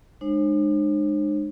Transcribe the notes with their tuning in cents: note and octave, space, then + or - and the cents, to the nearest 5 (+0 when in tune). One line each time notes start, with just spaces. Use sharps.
G#3 +0 D4 +45 C5 +40